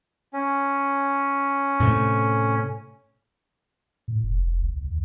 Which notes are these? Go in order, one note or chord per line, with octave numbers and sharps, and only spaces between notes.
C#4
A2 C3 A3
A2
F1
F1
C2
C#2
D#2